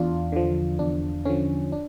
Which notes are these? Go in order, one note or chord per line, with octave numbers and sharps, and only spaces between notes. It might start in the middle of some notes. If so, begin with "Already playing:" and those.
Already playing: E2 D4 F4
D3 F3
E2 D4
D3 F3 C#4
D4